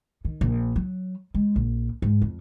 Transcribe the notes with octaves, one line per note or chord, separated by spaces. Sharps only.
D#3
A#1
F#3
G#3
A#1
G#2
F2